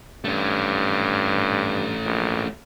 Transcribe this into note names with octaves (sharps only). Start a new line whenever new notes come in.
G2 A3 C#4
A#1